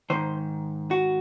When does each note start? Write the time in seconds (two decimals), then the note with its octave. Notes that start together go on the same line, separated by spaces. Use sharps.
0.10 G#2 D#3 C5
0.91 F#4